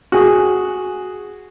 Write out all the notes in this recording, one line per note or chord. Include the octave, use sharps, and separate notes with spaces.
F#4 G#4